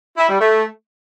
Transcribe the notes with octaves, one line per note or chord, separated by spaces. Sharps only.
E4
G3
A3